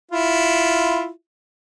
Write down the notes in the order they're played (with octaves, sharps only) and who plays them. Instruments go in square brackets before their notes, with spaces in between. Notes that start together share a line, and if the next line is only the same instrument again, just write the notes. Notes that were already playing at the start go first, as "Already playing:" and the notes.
[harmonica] E4 F4